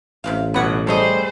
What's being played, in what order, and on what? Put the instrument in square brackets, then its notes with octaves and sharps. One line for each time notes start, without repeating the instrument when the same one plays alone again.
[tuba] A1 [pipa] C3 C4 F5
[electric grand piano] G1 B2 G#6 [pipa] B4 F#5
[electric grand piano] G3 A3 [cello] G#4 C5 [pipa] A4 C#5 D#5